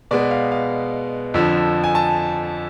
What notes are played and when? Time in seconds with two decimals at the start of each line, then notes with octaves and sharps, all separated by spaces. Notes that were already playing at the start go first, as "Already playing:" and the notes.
0.11 B2 G#3 B3 D5
0.31 F5
0.52 F5
1.34 F2 D3 F3
1.84 G#5
1.95 A5